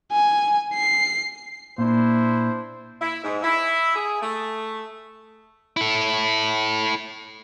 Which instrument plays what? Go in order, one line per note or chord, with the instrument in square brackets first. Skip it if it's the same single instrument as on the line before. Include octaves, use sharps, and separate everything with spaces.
[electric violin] G#5
C7
[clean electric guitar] A#2 [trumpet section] D4 E4 C5
[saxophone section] E4
G#2
E4
G#4
A3
[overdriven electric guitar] E4 A4